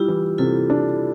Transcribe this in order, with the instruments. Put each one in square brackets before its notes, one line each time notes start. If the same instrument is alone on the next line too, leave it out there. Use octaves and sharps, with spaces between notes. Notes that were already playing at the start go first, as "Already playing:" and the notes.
Already playing: [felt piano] G3 [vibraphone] E4 F4 G4
[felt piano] E3
[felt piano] C3 [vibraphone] F4 A4
[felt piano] D4